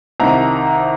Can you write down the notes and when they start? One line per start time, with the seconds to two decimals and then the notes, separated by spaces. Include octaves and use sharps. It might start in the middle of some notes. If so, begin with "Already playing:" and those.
0.20 C2 C3 D#3 A#5